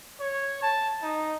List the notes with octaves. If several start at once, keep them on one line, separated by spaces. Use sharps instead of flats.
C#5
A5
D#4